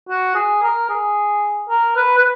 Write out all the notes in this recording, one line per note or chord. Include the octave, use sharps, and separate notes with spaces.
F#4
G#4
A#4
G#4
A#4
B4
B4